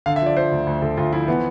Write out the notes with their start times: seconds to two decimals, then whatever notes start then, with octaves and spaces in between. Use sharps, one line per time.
0.06 D3 F5
0.16 E5
0.22 F3 D5
0.37 F3 C5
0.52 D2
0.67 D2
0.82 D2 A4
0.97 D2 F4
1.13 F3 E4
1.28 E3 B3